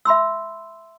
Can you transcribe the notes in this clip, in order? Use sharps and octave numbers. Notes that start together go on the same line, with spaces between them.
E5 B5 C6 E6